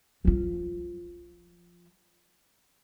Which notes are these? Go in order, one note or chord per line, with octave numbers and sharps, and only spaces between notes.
F3 F4